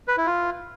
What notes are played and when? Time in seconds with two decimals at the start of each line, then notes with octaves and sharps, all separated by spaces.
0.08 B4
0.17 E4
0.27 F4